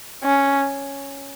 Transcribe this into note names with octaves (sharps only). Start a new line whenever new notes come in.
C#4